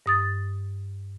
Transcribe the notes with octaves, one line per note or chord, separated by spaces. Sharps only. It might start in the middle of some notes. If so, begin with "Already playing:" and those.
G2 D#6 A6